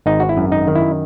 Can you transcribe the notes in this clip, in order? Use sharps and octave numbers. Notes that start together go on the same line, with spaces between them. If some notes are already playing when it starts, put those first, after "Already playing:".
G#1 D#4
F#4
E4
F#2
D#4
D#3
E4